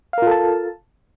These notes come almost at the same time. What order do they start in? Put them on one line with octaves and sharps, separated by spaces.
F5 A#4 F4 A4 A5